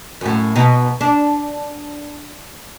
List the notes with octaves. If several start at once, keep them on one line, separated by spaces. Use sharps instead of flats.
F#2 A2
B2 D#4
D4